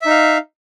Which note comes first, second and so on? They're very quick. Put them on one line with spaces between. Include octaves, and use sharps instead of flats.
E5 D#4 F5